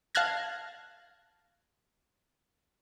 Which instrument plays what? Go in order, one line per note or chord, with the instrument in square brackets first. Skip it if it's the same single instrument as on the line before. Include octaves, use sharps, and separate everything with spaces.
[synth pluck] F5 A5 F6 F#6 G#6 A#6